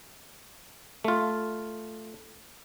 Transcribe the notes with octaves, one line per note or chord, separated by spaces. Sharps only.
A3 F4